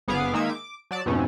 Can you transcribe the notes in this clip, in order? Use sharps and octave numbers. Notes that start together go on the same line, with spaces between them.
G1 B3 G#4 F5 D6
D#3 G#3 A#3 D#4 E5 G#6
D6
F#3 D5 A5
F2 G#2 B2 A3 C#4